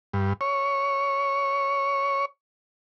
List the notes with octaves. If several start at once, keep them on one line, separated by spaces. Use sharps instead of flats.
G2
C#5